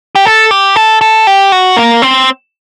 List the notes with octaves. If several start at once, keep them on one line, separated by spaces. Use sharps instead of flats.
G4
A4
G4
A4
A4
G4
F#4
A#3
C4